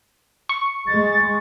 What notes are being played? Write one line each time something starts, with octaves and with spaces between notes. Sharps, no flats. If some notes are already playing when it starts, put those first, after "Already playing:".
C#6
G#3 A6